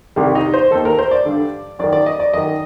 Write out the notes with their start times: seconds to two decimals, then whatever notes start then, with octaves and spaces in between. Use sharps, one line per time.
0.16 C2 C3 D#3 G3
0.35 D#4
0.54 C5
0.71 D#2 D#3 A4
0.85 A#4
0.99 C5
1.11 D5
1.25 G2 D3
1.79 F#2 D#3 D5
1.93 D5
2.06 D#5
2.20 D5
2.33 F#2 D#3 D#5